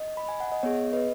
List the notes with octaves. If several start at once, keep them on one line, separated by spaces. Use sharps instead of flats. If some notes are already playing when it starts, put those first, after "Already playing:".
Already playing: D#5
B5
G#5
F#5
D#5
B3 G#4 C#5
B4 D#5